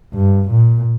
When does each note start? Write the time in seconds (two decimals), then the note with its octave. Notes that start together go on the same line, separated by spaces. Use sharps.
0.14 G2
0.51 A#2